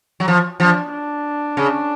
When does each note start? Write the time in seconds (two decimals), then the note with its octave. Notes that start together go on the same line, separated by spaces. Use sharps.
0.20 F#3
0.28 F3
0.60 F3 D4
0.92 D4
1.57 C#3